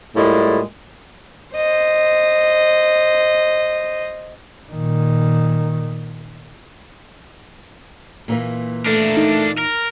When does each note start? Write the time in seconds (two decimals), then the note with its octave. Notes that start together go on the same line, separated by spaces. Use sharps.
0.16 A2 G3 G#3 A#3 F4
1.56 C5 D#5
4.72 A#2 D#3
8.28 A#2 E3 A#3
8.86 A3 D4 A#4
9.17 D#4
9.58 A#4